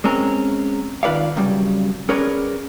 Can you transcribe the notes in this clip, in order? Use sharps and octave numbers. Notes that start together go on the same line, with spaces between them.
G#3 C4 C#4 A#4
D#3 F4 B4 D5 F5
C2 F#2 C#3 G3
C#4 G#4 A#4 B4 C#5 D5